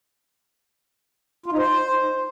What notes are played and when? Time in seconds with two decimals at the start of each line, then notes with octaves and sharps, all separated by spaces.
1.46 F4
1.52 D#4
1.58 C5